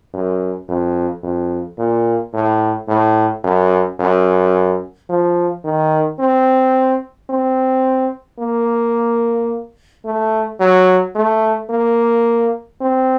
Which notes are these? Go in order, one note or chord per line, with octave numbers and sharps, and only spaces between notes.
F#2
F2
F2
A#2
A2
A2
F#2
F#2
F3
D#3
C4
C4
A#3
A3
F#3
A3
A#3
C4